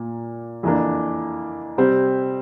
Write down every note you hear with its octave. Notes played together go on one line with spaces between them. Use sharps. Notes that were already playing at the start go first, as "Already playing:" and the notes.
Already playing: A#2 A#3
F2 E3 A#3 D4
C3 G3 C4